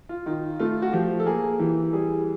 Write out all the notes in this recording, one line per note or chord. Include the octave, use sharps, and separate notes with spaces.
F4
D#3 F4
A3 F4
F#4
F3 G4
A4
A#3 G#4
E3 G4
G3 G#4